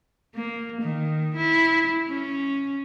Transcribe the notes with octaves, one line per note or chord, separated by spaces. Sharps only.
A#3
D#3
E4
C#4